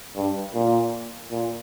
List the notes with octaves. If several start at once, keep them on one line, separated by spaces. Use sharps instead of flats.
G2
A#2
A#2